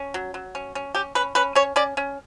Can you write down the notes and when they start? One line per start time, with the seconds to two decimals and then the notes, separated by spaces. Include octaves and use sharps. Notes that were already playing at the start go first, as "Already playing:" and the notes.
Already playing: C#4
0.14 F#3
0.34 F#3
0.55 C#4
0.75 C#4
0.95 C#4 G4
1.15 C#4 B4
1.35 C#4 B4
1.55 C#4 C#5
1.76 C#4 D5
1.97 C#4